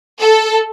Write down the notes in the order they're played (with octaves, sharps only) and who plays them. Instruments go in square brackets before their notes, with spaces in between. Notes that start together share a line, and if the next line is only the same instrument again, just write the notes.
[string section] A4